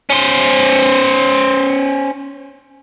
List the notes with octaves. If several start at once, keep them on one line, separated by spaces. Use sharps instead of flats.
C#4 C5